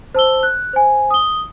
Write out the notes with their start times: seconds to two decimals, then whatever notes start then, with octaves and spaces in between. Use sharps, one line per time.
0.15 C5 A5 E6 G7
0.43 F#6
0.73 C5 G#5
1.10 D#6 G7